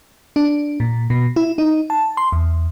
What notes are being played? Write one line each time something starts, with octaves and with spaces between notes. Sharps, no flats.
D4
A#2
B2
E4
D#4
A5
C6
E2